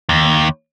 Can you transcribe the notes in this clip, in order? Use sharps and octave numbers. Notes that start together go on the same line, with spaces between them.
D#2